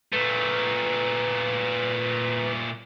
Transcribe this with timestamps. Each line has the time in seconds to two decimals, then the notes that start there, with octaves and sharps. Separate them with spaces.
0.13 A#2 A3 B4